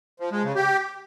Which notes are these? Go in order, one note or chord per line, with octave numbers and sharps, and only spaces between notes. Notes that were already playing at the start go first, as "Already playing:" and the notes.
F3
G#3
C#3
G4